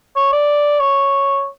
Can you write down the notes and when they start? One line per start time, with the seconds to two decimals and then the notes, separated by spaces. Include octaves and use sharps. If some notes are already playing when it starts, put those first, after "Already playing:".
0.16 C#5
0.33 D5
0.80 C#5